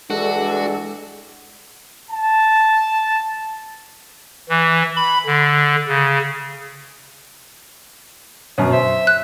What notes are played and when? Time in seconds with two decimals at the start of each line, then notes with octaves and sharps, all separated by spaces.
0.10 G2 E3 G#3 D4 F#4 A4
2.11 A5
4.49 E3
4.97 B5
5.26 D3
5.88 C#3
8.58 F#2 B2 C#4
8.72 C5 E5
9.07 F#6